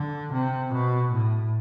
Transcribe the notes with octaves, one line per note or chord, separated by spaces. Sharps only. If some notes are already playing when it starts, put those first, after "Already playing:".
Already playing: D3
C3
B2
A2